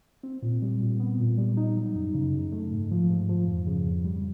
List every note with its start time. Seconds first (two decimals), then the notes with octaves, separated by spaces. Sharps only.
0.23 C4
0.42 A#2
0.62 G3
0.81 A#2
1.00 B3
1.19 A#2
1.38 G3
1.57 D#4
1.76 F#3
1.95 F#2
2.14 C#3
2.33 F#2
2.52 A3
2.72 G#2
2.91 F3
3.09 G#2
3.29 F3
3.47 F2
3.67 C#3
3.86 F2
4.05 G3